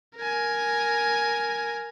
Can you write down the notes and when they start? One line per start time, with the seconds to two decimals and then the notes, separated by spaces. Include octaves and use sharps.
0.17 A#4 G#5